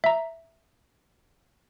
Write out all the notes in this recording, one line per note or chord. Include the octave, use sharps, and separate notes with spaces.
E5 A#5